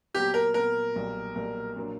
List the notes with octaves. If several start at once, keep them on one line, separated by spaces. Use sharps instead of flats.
A#2 F#3 B3 G4
A#4
A#2 F#3 B3 A#4
B1 A#2 G3 A#3
B1 A#2 G3 A#3
A#2 F#3 A#3 D4